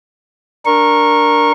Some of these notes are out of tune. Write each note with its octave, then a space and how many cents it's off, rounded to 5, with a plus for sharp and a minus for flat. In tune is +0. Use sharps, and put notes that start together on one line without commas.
D4 +0 A#4 +0 C#6 -20